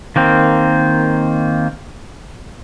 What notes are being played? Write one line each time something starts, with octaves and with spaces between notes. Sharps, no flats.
D#3 A#3 C4